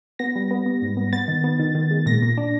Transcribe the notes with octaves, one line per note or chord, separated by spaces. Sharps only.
B3 A#6
G3
B3
B3
G#2
B3
B3 A6
D#3
B3
D#3
D#3
G#3
A#2 A#6
A#2
D4